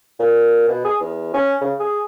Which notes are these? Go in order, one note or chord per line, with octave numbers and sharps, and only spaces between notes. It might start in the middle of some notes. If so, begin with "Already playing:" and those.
A#2
B2
G#4
E2
C#4
C#3
G#4